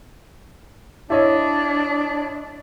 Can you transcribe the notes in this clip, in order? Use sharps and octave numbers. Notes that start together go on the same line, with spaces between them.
D4 E4 C#5 D#5